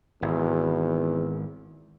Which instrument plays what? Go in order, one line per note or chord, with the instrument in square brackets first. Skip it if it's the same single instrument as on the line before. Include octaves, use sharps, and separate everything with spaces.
[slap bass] G#1 [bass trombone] E2